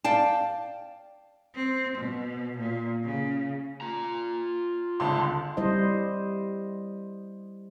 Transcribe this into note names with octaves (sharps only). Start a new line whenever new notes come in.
D5 F5 G5 A5
C4
B2
A#2
C#3
F4 A#5
G1 C#2 A5 C6
G3 E4 C5 D#5